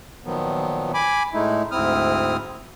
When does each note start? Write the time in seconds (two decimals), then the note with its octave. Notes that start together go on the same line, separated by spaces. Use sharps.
0.24 A#2 D#3 F3 F#3 B3
0.94 G#5 B5 D6
1.33 A2 G#3 A3 D#4 E4
1.71 D2 G#2 C4 E4 D#6 F6